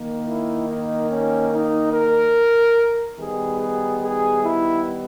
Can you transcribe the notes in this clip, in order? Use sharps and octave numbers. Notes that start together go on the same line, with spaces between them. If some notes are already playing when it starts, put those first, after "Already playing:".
Already playing: D#3 A#3
E4
D#4
C#4
D#4
A#4
D#3 G3 B3 G#4
G#4
G#4
E4